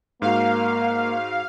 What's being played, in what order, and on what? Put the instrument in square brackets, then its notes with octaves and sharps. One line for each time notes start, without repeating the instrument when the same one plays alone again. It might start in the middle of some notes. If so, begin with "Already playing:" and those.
[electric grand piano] G#2 F#4 [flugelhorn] A#3 [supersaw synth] F5